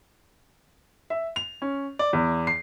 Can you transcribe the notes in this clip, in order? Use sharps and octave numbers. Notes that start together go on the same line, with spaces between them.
E5
F7
C#4
D5
E2
C7